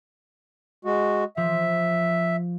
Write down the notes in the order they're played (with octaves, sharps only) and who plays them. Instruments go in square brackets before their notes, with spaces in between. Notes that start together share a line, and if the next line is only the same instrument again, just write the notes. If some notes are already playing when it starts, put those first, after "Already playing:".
[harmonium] G#3 F#4
[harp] F3 [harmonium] E5